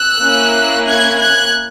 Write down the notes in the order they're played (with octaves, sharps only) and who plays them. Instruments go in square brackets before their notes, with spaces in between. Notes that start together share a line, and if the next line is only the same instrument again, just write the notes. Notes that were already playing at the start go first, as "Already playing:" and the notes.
Already playing: [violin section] E6 F#6
A#3 C#4 E4
F#6 G#6
F#6 G#6